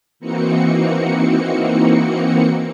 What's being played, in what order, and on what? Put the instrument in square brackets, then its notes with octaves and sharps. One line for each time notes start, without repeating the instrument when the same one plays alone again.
[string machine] E3 A#3 C4 D#4 F#4 C#7